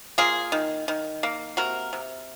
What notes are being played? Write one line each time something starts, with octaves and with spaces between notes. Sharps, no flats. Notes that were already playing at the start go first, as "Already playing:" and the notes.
A#3 F4 G#4
D#3
D#3
A#3
C3 F#4 A#4
C3